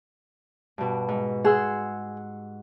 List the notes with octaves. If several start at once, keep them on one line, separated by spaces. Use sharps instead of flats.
G2 B2
G#2
G#4 F#5 C6 E6